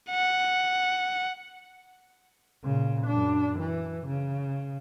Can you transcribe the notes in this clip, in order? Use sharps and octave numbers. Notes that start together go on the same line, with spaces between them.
F#5
A#2 C#3
F#2 D4
E3
C#3